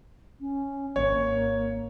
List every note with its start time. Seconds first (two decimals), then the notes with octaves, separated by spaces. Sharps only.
0.40 C#4
0.96 G#1 A#3 C#5